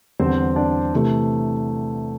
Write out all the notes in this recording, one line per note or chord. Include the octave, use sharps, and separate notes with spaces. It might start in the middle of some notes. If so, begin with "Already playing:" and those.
E2 D3 G3 C4 C5
D4 D5
C3 E3 A3